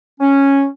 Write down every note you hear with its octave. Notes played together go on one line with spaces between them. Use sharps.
C#4